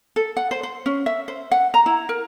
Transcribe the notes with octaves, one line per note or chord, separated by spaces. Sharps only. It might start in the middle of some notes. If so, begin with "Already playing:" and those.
A4
F#5
C5
C5
C#4
E5
C5
F#5
A#5
E4
A#4